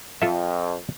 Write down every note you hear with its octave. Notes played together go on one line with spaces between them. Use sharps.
F2 F4 A4 E5